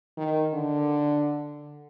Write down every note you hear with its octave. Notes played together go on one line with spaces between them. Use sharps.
D#3
D3